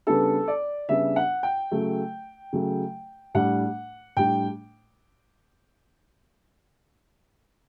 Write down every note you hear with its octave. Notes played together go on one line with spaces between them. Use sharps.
C#3 G3 B3 D4 A4
D5
C#3 G3 B3 D4 E5
F#5
G5
C#3 F#3 A3
C#3 F#3 A3
A2 G3 D4 F#5
A2 G3 D4 G5